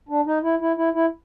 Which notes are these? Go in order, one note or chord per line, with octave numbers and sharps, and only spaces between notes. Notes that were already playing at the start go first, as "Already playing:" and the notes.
D4
D#4
E4
E4
E4
E4